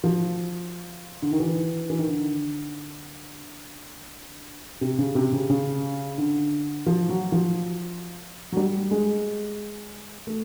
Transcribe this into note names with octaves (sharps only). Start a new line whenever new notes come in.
F3
D3
D#3
E3
E3
D#3
D3
C3
C#3
C3
C#3
C#3
D3
F3
F#3
F3
F#3
G3
G#3
A3